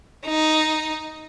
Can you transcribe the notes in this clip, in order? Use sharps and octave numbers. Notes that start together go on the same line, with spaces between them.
D#4